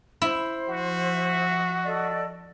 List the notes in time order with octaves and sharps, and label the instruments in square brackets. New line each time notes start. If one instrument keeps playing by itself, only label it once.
[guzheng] E4 [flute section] C5
[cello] F3 E5 [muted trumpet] F#4
[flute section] A4 D5 D#5